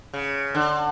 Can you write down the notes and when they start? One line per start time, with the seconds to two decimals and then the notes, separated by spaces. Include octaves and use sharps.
0.13 C#3
0.55 D3